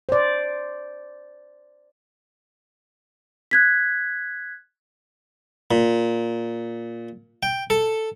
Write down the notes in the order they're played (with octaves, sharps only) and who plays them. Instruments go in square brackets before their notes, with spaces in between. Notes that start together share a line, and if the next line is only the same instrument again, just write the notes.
[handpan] C5 D5
[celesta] F#6 G#6 B6
[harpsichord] A#2
G5
A4